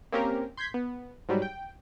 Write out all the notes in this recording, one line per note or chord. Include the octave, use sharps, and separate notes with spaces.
A#3 C4 C#4 G4 A#4
C6 G6 G#6 B6
B3
G#2 F#3 G3
G5